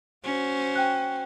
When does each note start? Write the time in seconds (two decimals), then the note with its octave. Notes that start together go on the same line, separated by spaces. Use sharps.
0.24 C#4 F#4 C5
0.76 G5 F#6